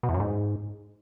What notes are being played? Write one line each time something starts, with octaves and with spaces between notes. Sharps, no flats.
B2
E2
F#2
G#2